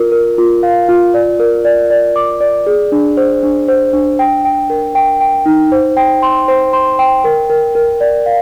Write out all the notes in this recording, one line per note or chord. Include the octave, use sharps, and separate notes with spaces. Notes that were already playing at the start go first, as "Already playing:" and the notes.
Already playing: F4 A#4
A#4
F4
F5
F4
D5
A#4
D5
D5
D6
D5
G#4
D4
C5
D4
C5
D4
G5
G5
A#4
G5
G5
D#4
C5
G5
C6
C5
C6
G5
A#4
A#4
A#4
D5
F5